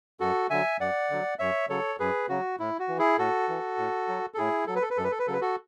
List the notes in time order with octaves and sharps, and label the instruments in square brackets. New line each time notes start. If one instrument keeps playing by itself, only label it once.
[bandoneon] F#2 F#4 A4
D3 F#3 E5 G#5
F#2 D5 F#5
D3 F#3
F#2 C#5 E5
C#3 F#3 A4 C#5
F#2 G#4 B4
C#3 F#3 F#4
A2 E4
F#4
E3
E4 G#4
A2 F#4 A4
E3
A2
F#3
A4
A2 E4 G#4
F#3 A4
B4
A4
B4
F#2 A4
B4
A4
B4
C#3 F#3 A4
B4
F#4 A4